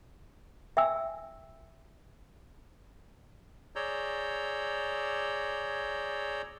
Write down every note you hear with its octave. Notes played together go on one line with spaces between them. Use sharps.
E5 G5 G#5 E6
G#4 C#5 D5 A#5 E6 G6